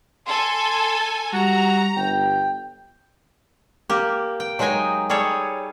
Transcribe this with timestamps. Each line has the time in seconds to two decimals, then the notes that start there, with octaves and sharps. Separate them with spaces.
0.27 A4 G#5 C6
1.33 G3 F#4 A#5
1.96 G1 G5
3.90 A#3 G4
4.40 G5
4.59 F#3 G#3 D#4 G5 G#5
5.10 G3 G#4 A4 C#5